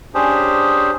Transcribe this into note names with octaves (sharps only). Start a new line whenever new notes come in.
C#4 D4 G4 G#4 C5